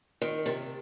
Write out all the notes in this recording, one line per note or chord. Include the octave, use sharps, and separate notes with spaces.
D#3
C3